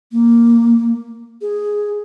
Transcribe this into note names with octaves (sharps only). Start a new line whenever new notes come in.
A#3
G#4